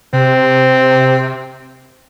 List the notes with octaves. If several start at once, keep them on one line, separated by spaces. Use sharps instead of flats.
C3 C4